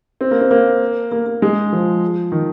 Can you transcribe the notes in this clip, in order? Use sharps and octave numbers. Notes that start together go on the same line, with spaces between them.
C4
A#3
C4
A#3
A#3
A#3
G#3
F3
D#3